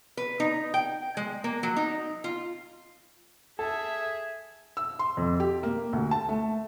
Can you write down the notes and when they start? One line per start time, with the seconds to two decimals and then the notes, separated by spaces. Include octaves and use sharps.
0.17 B4
0.40 D#4
0.74 G5
1.17 G#3
1.44 A#3
1.63 F#3
1.77 D#4
2.24 F4
3.59 G#4 A4 E5
4.77 E6
4.99 C6
5.17 F2
5.40 G4
5.63 A#3
5.93 D2
6.11 A5
6.29 A3